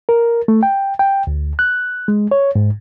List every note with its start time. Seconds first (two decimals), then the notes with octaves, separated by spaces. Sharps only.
0.09 A#4
0.48 A3
0.63 G5
0.99 G5
1.27 D2
1.59 F#6
2.08 G#3
2.31 C#5
2.55 G#2